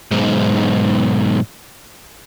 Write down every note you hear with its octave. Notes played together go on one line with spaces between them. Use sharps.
B1 G#2